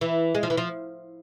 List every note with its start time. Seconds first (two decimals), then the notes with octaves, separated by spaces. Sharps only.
0.01 E3
0.35 G#3
0.43 F3
0.50 E3
0.57 F3